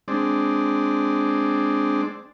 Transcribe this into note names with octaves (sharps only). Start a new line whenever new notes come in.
G#3 C4 D4